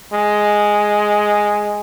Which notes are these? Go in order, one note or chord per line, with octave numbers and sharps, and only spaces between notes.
G#3